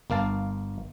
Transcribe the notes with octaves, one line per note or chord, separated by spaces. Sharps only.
G1 A#3 F5 A5